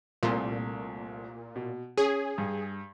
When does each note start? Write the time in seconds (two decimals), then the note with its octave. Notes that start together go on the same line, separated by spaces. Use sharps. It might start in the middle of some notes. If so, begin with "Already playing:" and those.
0.23 C2 A#2 A3 C6
1.56 B2
1.97 C#4 G#4
2.38 G2